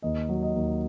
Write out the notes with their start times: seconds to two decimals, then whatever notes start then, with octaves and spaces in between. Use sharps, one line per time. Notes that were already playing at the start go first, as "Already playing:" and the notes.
0.02 D#2 D#5
0.29 F#3
0.43 D#5
0.55 D#2